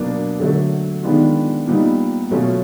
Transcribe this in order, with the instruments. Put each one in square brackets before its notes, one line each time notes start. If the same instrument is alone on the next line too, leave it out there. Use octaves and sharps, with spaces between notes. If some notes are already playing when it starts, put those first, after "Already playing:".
Already playing: [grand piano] B2 F#3 A#3 D4
D3 F#3 A3
D#3 G#3 B3 D4 F4
A#2 G3 B3 D#4
B2 F#3 A3 C#4 F4